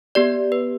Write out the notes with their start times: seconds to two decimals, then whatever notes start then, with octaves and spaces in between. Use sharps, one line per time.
0.15 B3 G4 D5
0.52 B4